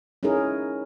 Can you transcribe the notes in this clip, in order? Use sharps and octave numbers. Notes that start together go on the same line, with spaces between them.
C#4 D#4 E4 G#4 A#4